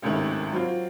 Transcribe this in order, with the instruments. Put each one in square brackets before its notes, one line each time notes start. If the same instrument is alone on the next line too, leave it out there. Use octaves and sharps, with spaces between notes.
[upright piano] G#1 C#2 A2 C3 D#3
F#3 C4 F4